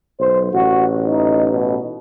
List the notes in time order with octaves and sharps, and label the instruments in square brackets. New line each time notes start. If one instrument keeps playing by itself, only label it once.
[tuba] B1 [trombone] C5
[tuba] A1 [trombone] F#4
[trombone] D#4
B2